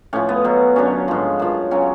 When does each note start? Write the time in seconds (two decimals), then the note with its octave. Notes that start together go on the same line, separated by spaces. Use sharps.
0.13 A2 F3 C#4
0.29 B3
0.44 B2 F#3
0.76 F#2 D3 F#3 C#4
1.08 G#2 F3
1.39 F#2 F3
1.71 C#3 F#3 C#4